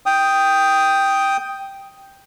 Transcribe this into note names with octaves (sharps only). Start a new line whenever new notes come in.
G5 D#6